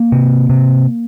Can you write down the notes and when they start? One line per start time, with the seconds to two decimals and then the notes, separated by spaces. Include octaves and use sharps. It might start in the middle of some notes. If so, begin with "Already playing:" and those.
Already playing: A#3
0.12 C3
0.50 C3